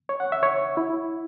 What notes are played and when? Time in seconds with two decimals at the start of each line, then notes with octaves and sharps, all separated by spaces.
0.09 C#5
0.20 F#5
0.32 E5
0.43 C#5
0.77 E4